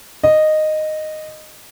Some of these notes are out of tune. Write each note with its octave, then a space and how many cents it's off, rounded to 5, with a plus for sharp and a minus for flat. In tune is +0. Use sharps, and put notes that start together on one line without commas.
D#5 -10